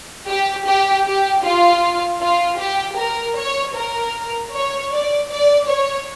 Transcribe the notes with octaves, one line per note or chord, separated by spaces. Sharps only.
G4
G4
G4
F4
F4
G4
A#4
C#5
A#4
C#5
D5
D5
C#5